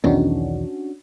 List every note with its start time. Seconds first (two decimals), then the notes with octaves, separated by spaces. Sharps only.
0.04 B1 E2 D#3 C#4 D4 F#4